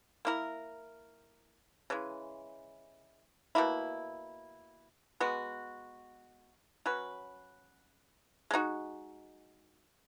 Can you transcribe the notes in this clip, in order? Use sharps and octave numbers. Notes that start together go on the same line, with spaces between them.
A#3 E4 A#4
C#3 E3 G#3
B2 A#3 E4
G#3 B3 F#4
F#3 C#4 F#4 B4
G#3 D#4 F#4